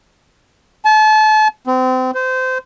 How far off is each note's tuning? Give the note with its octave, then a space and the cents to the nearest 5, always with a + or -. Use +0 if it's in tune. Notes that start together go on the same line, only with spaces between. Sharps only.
A5 -35
C4 -30
C5 -25